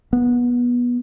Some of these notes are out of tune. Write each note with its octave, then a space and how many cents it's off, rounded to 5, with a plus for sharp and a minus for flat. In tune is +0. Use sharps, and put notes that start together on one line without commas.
B3 -20